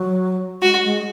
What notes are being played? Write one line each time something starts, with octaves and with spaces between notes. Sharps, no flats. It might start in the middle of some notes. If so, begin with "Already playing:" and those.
Already playing: F#3
G#3 F#4
G#3